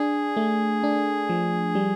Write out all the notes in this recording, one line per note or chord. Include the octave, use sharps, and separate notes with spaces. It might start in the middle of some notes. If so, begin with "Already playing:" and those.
Already playing: D4 G#4
A3
D4
F3
G3